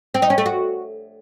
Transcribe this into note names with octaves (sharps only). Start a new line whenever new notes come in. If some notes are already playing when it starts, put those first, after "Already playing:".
C4
D#4
C#4
A3
F#4